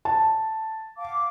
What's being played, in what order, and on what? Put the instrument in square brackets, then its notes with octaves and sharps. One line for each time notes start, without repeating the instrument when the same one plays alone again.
[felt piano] A5
[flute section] F5 F#5 D6